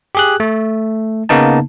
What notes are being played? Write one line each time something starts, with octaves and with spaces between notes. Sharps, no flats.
G4 G#4 F#6
A3
C#3 A#3 B3 D#4 A5